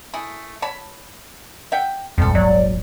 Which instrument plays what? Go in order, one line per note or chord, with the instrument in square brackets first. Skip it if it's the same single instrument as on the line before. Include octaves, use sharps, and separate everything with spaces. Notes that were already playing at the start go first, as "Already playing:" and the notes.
[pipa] A3 E4 G#4
C#5 A5 B5
E5 F#5 G5
[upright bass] D#1 G#1 [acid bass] F2 [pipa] G3 A4
[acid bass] F#3 [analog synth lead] D5